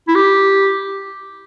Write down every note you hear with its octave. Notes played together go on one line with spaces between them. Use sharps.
E4
G4